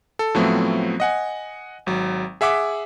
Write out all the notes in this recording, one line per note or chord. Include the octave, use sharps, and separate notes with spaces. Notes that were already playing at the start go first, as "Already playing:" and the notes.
A4
A2 F3 F#3 A3 B3 C4
D#5 F#5 G#5
G#1 F#3
G#4 E5 F#5 D6 B6